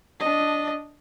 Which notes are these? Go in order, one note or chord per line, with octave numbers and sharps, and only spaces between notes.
D4 D#5